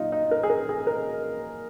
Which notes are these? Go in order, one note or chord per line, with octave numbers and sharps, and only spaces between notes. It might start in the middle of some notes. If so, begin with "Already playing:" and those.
Already playing: A#2 F#3 D#4 F4
D#4
A#4
G#4
A#4
G#4
A#4